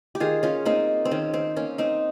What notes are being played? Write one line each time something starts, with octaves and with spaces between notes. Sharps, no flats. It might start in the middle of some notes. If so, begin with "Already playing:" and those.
G4
D#3 F4 G#4
C#4 F4
A#3 C4 D#4
C4
D#3 C#4
C4
A#3 C#4
C4 D#4